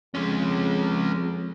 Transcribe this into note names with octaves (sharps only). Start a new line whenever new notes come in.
F2 G#3 C#4